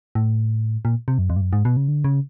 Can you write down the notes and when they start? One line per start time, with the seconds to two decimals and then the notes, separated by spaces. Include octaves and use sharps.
0.15 A2
0.85 A#2
1.08 C3
1.18 F#2
1.30 F2
1.36 G2
1.41 F#2
1.53 G#2
1.65 B2
1.77 C#3
1.88 D3
2.04 C#3